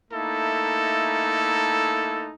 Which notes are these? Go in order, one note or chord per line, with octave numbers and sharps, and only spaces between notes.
A3 A#3 D#4 E4 A4